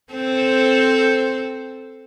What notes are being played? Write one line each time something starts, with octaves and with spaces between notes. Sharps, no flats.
C4 A4 C5